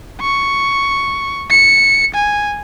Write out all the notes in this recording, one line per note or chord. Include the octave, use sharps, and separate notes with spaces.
C#6
C#7
G#5